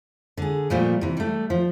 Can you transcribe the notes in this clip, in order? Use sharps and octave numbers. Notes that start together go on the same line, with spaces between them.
D3 G#4
A#2 F3 G3 A3 A#3
C3 E3
G3 A3
F3